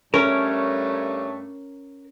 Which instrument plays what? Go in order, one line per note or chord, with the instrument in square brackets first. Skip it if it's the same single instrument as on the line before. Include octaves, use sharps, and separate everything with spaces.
[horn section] G2 A3 C#5 [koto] C#4 [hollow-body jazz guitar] A#4